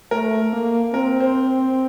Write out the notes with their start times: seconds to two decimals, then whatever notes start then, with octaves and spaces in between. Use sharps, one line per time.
0.11 A3 A#4
0.53 A#3
0.94 C4 A#4
1.20 C5